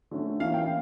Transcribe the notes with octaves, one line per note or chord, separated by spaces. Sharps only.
D3 A3 C#4
E3 A#3 C#4 F5
G5